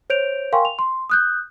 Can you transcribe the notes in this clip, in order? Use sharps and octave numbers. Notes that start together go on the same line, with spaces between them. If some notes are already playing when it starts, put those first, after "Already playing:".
C5 C#5 G6 D7 F7
A#4 F5 G5 G#5 C6 C#6
F7
C6
D#6 F#6 G6